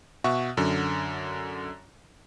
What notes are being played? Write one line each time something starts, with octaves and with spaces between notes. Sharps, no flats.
B2 E5 F#5 C#6
F#2 D3